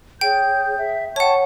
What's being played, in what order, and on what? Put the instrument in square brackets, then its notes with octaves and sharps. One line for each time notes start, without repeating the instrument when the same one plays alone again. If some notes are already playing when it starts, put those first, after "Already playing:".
[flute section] G#4 C#5 G6 [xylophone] G5
[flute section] E5
[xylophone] C#5 F#5 [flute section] G5 A5 C#6